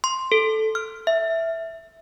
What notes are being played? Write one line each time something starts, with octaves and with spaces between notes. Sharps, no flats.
C6
A4
F6
E5